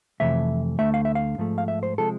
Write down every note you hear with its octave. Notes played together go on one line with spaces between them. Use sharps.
F2 C3 E3 A3 E5
D2 D3 A3 E5
F5
E5
F5
G#2 F3 A3
F5
E5
C5
C3 F3 G#3 A4